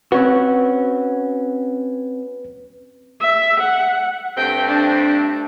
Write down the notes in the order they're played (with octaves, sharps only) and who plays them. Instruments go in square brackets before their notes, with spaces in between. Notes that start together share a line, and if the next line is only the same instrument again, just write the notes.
[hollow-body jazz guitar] C4 C#4 F#4 [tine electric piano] B4
[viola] E5
F#5
[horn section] G2 A3 C4 [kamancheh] G5
[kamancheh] D4